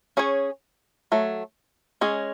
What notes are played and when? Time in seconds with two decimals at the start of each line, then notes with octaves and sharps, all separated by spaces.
0.17 C#4 G#4 C#5
1.12 F#3 A3
2.01 G#3 C#4 G#4